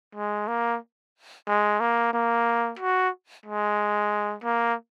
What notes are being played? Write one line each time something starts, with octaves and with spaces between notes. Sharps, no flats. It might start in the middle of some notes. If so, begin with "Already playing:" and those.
G#3
A#3
G#3
A#3
A#3
F#4
G#3
A#3